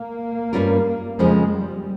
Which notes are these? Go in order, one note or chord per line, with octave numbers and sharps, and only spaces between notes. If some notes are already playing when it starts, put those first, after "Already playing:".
Already playing: A#3
G2 G3 C#4 F4 A#4
F2 C#3 F3 G#3
G3